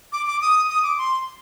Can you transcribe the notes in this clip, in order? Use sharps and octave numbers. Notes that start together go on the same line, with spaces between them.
D6
D6
D#6
D#6
D6
C6